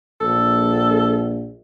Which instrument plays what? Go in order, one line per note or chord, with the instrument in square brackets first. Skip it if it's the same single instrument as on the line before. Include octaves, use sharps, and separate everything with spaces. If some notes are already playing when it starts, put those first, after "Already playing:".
[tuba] A#1 [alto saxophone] A4